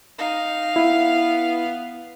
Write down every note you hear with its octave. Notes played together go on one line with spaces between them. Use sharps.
D#4 F5
B3 E4